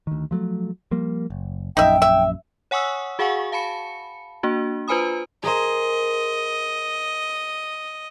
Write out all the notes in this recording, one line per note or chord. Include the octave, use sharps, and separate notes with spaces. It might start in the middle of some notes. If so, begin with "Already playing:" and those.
D2 D#3
F3 F#3 A3
F3 G3 A#3
F#1
A#1 F#2 D#4 E5 G5
E5
C#5 F#5 G#5 C#6 D#6 E6
F#4 G#4 F5 F#5 G#5 C#6
F5 A5 B5 C#7
A#3 D4 F#4
F4 B4 C5 G#5 B5 D#6
G#4 A#4 C5 D#5